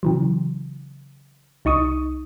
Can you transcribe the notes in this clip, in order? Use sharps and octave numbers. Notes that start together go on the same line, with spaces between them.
C#3 E3 F#3
C2 D#4 C#6 D#6